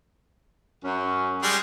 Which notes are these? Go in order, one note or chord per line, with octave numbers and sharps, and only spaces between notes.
F#2 C#4
G3 G#3 G#4